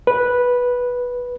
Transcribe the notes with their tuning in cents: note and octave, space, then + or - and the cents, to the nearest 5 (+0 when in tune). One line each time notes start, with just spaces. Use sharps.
B4 -10